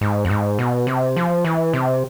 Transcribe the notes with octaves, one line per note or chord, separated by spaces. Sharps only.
G#2
F2
G#2
B2
C3
F3
E3
C3